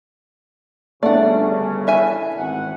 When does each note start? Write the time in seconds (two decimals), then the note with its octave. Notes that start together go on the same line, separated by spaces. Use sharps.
1.03 G1 C#3 A3 D4 D5 F#5
1.87 E3 E5 G#5
2.37 G#1 F#5